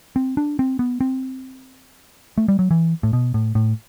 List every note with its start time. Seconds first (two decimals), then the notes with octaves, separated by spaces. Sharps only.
0.16 C4
0.37 D4
0.59 C4
0.79 B3
1.01 C4
2.38 A3
2.48 G3
2.59 F#3
2.71 E3
3.03 A2
3.13 B2
3.34 A2
3.55 A2